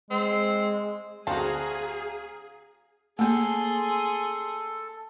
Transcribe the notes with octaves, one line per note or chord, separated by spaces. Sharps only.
G#3 C4
D2 C4 F#4 G#4 A4 F5 A#5
A3 A#3 G#4 A4 C6